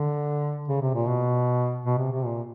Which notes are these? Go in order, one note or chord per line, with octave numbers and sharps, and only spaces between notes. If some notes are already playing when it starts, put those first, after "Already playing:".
Already playing: D3
C#3
C3
A#2
B2
B2
C3
C3
A#2